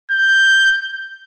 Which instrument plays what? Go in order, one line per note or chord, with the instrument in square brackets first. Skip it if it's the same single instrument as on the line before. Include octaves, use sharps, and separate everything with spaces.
[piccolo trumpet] G6